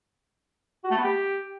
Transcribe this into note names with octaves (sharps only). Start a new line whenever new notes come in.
F#4
A3
B3
G4